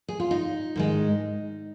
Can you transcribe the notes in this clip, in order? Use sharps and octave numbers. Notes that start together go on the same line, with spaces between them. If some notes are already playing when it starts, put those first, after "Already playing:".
G#4
F4
D#4
G#2 D#3 G#3